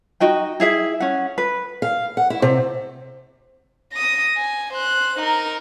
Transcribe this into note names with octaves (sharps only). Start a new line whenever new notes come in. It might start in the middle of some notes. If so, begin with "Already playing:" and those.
D#4 F#4 D#5 G5
E4 G#4 E5
C#4 F#5
B4
F5
F#5
E4
C3
D#6 A#6
G#5
C5 F#6
D#4 A#4